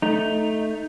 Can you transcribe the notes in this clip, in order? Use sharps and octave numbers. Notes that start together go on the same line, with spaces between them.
A3 D#4